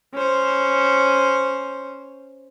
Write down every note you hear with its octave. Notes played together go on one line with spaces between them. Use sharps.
C#4 C5